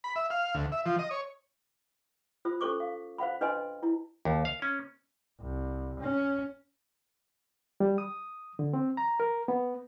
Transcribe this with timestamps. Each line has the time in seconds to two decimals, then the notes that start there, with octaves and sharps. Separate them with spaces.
0.04 B5
0.16 E5
0.30 F5
0.55 D2
0.72 E5
0.86 F3
0.99 D#5
1.11 C#5
2.45 F4 C5 D#6
2.61 C#4 A4 C5 C#6 D6
2.80 F5
3.18 C5 F5 F#5 B5
3.41 D4 B4 C5 D#5 G#5 C6
3.82 E4 A#5
4.25 D#2
4.45 F5
4.62 C#4
5.41 C2
6.00 C#4
7.80 G3
7.98 D#6
8.59 D3
8.73 C4
8.97 A#5
9.20 A#4
9.48 B3